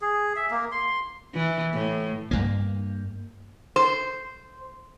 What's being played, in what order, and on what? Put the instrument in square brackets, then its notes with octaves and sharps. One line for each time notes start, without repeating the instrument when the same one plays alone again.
[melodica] G#4
E5
A#3
C6
[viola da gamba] E3
A2
[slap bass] G2 A#3
[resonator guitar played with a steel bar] C5